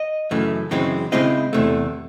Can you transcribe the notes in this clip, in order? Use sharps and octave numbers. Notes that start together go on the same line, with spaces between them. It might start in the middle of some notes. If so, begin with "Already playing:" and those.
Already playing: D#5
F#2 C#3 E3 A3
F#2 C#3 E3 G#3 C4
C#3 G#3 C4 E4 D#5
E2 C3 E3 A3